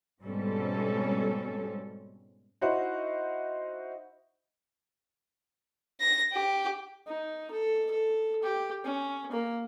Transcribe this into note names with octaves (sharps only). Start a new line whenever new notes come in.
G#2 B2 G3 C4 C#4 A4
D#4 E4 F#4 C5 E5 F#5
A#6
G4
D#4
A4
A4
G4
C#4
A#3